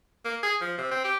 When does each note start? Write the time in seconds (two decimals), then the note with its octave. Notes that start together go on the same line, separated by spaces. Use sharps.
0.25 A#3
0.43 G#4
0.61 F3
0.78 C3
0.91 C4
1.04 G4